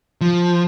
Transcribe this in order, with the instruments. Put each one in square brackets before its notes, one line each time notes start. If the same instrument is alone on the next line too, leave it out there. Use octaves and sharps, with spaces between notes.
[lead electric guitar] F3